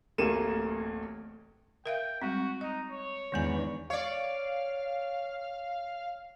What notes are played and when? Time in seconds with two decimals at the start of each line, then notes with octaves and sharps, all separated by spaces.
0.18 D1 A1 A3 A#3 D#7 E7
1.86 A#4 E5 F5 G5
2.21 G3 G#3 C4 F#4
2.61 D#4 D#5
2.91 C#5
3.32 E2 G#2 D#3 G#3 D4 G#5
3.90 C#5 D5 F5